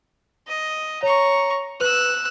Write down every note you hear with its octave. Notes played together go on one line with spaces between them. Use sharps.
D#5
C#5 A#5 C#6
B4 E6 F#6